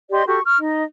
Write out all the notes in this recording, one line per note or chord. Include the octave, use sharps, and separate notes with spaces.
G4 D5 D#5 C6
F#4 G4 A4 C#6
C#6 F6
D#4 D#5